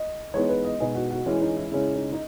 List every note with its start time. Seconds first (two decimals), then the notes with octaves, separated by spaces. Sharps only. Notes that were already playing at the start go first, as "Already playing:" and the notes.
Already playing: D#5
0.34 E3 G#3 B3 D#4 C#5
0.49 B4
0.65 D#5
0.80 B2 G#3 B3 D#4 G#4
0.95 F#4
1.11 F#4
1.26 E3 G#3 C#4 E4
1.41 D#4
1.57 E4
1.72 C#3 G#3 C#4 E4
1.95 D#4
2.12 D#4